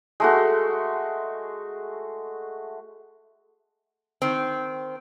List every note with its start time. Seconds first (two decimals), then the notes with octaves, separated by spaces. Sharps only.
0.20 G#3 A3 F#4
4.22 D#3 C4